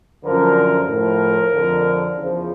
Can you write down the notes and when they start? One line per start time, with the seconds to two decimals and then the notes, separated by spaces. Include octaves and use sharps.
0.23 F#2 D3 F3 A#4
0.88 A2 F3 A#4
1.51 F2 D3 F3
2.16 E2 C#3 F3